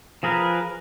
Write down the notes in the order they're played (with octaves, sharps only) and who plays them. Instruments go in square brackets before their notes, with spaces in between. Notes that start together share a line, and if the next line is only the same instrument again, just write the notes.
[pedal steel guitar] F3 G#4 A#4 B4